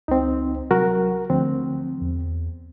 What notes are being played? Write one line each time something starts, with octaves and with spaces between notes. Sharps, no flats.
C#2 C4 D#4
C2 F#3 F#4 A#4
D2 F3 C4
E2